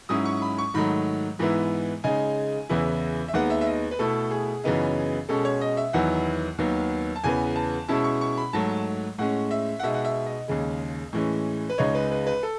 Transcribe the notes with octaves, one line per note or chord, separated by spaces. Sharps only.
G#2 F#3 C#4 E4 D#6
C#6
B5
C#6
G#2 D#3 F#3 A3 B5
G#2 E3 B3 E4
C#3 G#3 D#4 G#5
E2 C#3 E3 B3 E4
E5
D#2 D#3 G#3 B3 F#5
E5
E5
D#5
B4
B2 A3 E4 A4
G#4
F#2 C#3 E3 B3 D#4
B2 G#3 C#4 A4
C#5
D#5
E5
E2 D#3 F#3 B3 E4 F#5
D#2 D#3 F#3 B3
A5
E2 C#3 E3 B3 G#5
A5
B2 G#3 C#4 E4 A5
C#6
C#6
B5
G#2 F#3 A3 A5
A2 G#3 C#4 F#5
E5
F#5
B2 G#3 D#4 E5
F#5
E5
D#5
D#2 C#3 G#3
A2 E3 G#3 C#4
B4
C#2 C#3 G#3 D#4 C#5
B4
B4
B4
A4